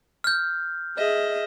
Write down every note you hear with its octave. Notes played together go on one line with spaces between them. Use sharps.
F6 G6
G#4 D#5 E5